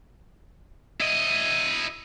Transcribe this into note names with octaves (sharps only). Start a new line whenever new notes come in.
E4 D#5